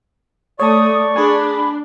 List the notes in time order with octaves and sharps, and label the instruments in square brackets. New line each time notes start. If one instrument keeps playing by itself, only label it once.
[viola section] A3 [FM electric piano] C#5 A5 [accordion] D5 C#6 [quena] D#6
[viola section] D4 [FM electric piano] G#4 G#5 [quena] B5